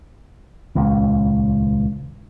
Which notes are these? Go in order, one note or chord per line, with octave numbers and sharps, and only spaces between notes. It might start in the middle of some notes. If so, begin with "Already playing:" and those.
D#1 C#2